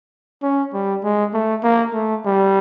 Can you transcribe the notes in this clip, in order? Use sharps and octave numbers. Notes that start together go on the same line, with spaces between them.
C#4
G3
G#3
A3
A#3
A3
G3